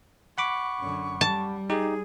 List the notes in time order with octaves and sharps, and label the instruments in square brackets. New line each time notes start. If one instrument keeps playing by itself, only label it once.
[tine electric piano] F#5 B5 D6 [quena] C#6
[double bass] F#2 D3
[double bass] G3 [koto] A5
[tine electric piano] D#4 G4 [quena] G#4